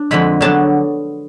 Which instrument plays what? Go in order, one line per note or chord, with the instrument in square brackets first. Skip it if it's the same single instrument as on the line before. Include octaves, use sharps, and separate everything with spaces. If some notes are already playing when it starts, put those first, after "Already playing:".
Already playing: [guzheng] D4
F2 D3 G#3 B5
D3 F#3 B3 D4 A5